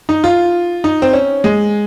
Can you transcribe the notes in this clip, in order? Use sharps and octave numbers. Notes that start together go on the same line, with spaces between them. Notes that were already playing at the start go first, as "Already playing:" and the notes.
D#4
F4
D#4
C4
C#4
G#3